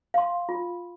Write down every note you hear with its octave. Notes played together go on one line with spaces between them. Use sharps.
F5 C6
F4